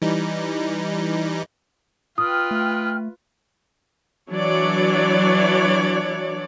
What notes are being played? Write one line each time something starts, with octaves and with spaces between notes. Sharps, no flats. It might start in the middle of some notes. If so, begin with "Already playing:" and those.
E3 G3 D#4
F4 B4 G5 D#6 F6
A3
E3 F#3 D4 C#5 D5